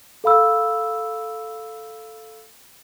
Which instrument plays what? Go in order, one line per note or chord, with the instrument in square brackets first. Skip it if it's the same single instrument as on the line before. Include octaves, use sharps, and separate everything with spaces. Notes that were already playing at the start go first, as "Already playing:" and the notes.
[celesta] A4 F5 B5 E6